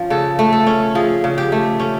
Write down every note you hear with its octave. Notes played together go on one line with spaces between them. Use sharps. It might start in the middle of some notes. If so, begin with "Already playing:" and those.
Already playing: F3 C#4
C#3 A4
A3
A4
C#4
F3 G#4
C#3
G4
A3
C#4